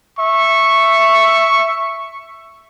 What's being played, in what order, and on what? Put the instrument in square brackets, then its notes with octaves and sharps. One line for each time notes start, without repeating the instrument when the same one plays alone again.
[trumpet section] E5 C#6